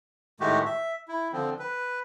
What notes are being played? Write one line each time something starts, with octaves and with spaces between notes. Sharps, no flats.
A2 D#3 G#3 A3 F#4 G4
E5
E4
D3 F3 C4
B4